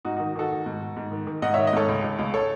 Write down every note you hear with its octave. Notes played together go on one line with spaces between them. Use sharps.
G#2 D#4 F#4
D#3 D#4 F#4
D#3 F#4 A4
D#3
G#2
G#2
G#2
D#3
D#3
G#2 D#5 F#5
D#3 C#5 E5
D#5
G#2 A4 C#5
C#2
C#2
C#2
A4 C#5